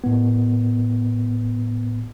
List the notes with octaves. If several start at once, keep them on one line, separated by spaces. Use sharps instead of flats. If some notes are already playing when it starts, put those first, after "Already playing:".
A2 B3